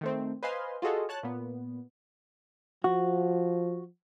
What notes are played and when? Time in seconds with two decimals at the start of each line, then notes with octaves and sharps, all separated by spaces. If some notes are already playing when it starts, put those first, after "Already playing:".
0.01 D#3 A3 C4
0.43 B4 C5 D#5 F5 G#5 C6
0.82 F4 F#4 G#4 A4 D#5
1.09 C#5 A5 F#6
1.23 A#2 B3
2.84 F3 F#4